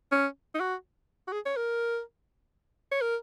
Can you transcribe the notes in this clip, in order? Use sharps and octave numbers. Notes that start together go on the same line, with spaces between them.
C#4
D#4
F#4
F#4
G#4
C#5
A#4
C#5
A#4